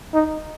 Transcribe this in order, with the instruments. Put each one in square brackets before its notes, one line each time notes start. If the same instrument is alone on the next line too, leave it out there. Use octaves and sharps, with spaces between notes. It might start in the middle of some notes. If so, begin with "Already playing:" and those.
[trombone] D#4